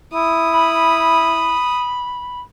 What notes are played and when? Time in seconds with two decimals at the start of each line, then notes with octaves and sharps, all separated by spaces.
0.14 E4 D#6
0.51 B5